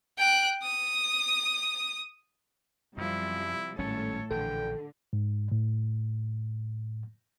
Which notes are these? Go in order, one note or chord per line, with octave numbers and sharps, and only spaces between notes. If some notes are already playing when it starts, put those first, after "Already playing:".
G5 F#6
D#6
F#2 C3 F3 G3 E4
G#1 A2 G3 C#4 A4 C#5
A#1 D3 E3 A4 G5
G#2
A2